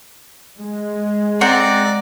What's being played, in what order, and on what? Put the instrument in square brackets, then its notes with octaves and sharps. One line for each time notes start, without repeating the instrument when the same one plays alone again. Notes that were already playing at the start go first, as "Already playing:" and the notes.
[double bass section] G#3
[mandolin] C4 F#5 [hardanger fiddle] D5 [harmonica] A#5